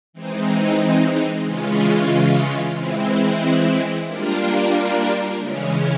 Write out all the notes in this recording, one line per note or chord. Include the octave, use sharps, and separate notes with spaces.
E3 G#3 C4 D#4
C#3 E3 G#3 C#4 F4
E3 G#3 C4 E4
G3 A#3 D4 F4 A#4
C#3 E3 G#3 C#4